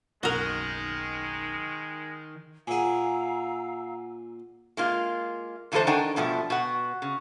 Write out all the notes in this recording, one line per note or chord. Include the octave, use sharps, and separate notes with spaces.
F#1 B1 D#3 G#3 F#4 A#4
A#2 G#4 F5 F#5 G#5 A#5 E6
G#3 A#3 F4
D3 E3 G#3 E4 A4 C5
D#3 D4 A#4 F#5 G#5
G2 B2 F3 A3
B2 F#5
C#3